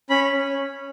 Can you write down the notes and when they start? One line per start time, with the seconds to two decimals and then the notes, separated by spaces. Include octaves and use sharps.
0.10 C#4 B5
0.33 C#4